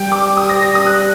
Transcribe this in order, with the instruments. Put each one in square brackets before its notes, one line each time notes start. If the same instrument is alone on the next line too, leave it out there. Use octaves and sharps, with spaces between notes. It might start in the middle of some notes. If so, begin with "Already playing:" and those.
Already playing: [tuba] G3 [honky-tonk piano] G5
[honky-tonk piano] D6
D#6
A#6
A#6
D#6
F#6